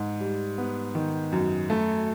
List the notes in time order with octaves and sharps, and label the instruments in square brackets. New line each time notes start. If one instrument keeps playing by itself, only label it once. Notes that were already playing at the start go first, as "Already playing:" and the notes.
Already playing: [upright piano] G#2
G3
B3
D#3
F#2
A3